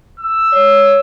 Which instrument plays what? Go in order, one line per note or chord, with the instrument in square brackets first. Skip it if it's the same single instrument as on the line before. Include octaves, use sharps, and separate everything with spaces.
[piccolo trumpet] E6
[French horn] C#5